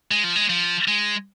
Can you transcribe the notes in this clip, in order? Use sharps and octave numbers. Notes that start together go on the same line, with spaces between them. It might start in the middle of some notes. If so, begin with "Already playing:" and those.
G#3
F3
G#3
F3
G#3